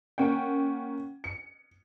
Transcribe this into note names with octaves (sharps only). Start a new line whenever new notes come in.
A#3 C#4 F#5 G5
C#7